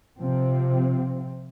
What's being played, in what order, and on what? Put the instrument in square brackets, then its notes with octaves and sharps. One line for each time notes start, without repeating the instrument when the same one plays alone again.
[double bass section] C3 F3 C4